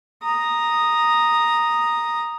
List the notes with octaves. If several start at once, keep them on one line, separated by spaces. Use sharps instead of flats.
A#5 D#6